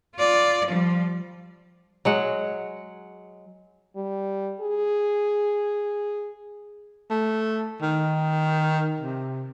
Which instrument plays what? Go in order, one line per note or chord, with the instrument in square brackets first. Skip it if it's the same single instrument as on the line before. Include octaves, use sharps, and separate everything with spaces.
[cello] F4 D5
F3 G3
[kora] F#3 G#3 F#5
[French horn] G3
G#4
[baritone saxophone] A3
D#3
C3